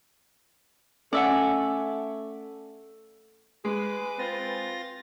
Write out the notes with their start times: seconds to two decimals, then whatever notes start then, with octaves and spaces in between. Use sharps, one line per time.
1.13 A3 C#4 D5 E5 F#5 G#5
3.65 G#3 G#4 B4 D6
4.19 C4 F4 A6 A#6